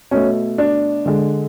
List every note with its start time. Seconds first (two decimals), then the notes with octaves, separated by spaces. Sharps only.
0.11 B2 A3 C#4
0.58 D4
1.06 D3 G#3